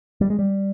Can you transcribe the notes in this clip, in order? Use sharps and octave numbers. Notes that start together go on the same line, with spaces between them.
G3
G#3
G3